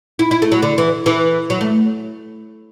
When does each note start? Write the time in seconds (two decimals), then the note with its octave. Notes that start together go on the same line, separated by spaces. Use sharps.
0.19 E4
0.31 E4
0.42 A3
0.52 F#3
0.62 D3
0.78 E3
1.06 E3
1.50 F#3
1.61 A3